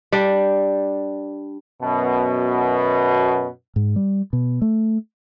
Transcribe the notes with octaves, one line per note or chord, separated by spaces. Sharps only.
G3 D4
F#2 B2
G#2
G3
B2
A3